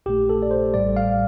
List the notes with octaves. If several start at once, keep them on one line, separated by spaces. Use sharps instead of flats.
A#1 A#2 A3 G4
A4
D5
C5
A1 A2 G3 D5
F5